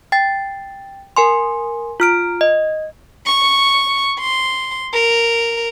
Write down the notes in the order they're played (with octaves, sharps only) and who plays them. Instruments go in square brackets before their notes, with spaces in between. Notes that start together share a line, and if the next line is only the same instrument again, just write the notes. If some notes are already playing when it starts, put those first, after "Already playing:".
[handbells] G5 A6
A#4 G#5 C6
F4 F6 D7
D#5
[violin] C#6
C6
A#4